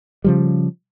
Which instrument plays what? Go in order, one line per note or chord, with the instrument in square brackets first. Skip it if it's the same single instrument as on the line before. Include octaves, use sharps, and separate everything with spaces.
[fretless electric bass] C#3 F3 G3